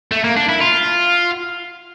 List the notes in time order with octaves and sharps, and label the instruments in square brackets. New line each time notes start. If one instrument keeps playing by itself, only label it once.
[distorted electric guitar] A3
A#3
D4
E4
F4